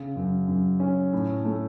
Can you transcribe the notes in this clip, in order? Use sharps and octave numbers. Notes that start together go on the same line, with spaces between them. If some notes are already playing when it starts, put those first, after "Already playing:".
Already playing: C#3
F#2
F#2
C#4
A2
A3